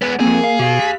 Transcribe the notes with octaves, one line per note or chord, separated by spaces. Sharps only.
G#3 B3 F#5
F3 A#3 C4 G#4
F5
B2 G4 F5
B6